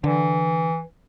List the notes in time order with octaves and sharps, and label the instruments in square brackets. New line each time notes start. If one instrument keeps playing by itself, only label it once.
[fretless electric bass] D3 [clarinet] E3